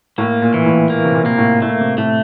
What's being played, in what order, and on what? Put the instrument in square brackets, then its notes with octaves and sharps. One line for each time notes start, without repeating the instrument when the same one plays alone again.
[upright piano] A2 [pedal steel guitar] A#3
[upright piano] A#2
[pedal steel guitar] E3
[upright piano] A2
[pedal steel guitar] A#3
[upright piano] C3
A#2
[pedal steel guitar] A#3
[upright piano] A2
[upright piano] A2 [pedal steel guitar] A3
[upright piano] C3
[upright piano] A2 [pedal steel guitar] A3